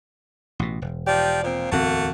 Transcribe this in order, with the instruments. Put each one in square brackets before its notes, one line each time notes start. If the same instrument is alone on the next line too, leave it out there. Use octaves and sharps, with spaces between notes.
[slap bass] A1 B2
E1
[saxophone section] F3 G4 D5
A#2 F3 C4
[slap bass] D1 E2 C4 [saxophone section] A3 A#3 F#4